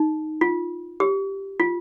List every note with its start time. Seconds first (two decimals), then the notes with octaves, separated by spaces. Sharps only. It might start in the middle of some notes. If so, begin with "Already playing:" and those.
Already playing: D#4
0.41 F4
1.00 G4
1.60 F4